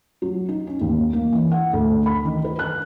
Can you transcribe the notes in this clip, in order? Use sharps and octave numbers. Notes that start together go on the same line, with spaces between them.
F#3
D#4
C#4
D#2
A#3
E3
F#5
D2
B5
D#3
B4
F#6